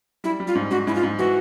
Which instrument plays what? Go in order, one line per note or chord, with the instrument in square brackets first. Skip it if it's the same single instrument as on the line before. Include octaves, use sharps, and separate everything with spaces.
[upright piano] G3 [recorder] E4
[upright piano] G3
[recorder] F4
[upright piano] G#2
[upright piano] G#2 [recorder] F#4
[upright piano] G#2 [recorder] E4
[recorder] F4
[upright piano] G#2
[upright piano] E3 [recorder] F#4